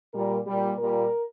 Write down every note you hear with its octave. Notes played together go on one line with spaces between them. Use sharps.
A#2 G3 A#4
A#2 G3 G4
A#2 G3 A#4